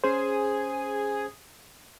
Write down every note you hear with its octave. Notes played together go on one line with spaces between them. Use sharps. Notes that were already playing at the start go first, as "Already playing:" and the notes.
C#4 G#4 C5